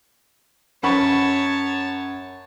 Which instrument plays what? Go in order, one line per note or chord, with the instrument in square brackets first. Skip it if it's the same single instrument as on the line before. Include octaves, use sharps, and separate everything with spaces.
[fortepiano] F#2 B5 C#6 [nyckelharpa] C#5 A5